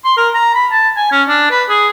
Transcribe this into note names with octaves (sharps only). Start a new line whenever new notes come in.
C6
A#4
A#5
B5
A5
G#5
C#4
D4
B4
G#4